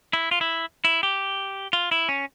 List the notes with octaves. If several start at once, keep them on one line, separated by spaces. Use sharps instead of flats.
E4
F4
E4
E4
G4
F4
E4
C#4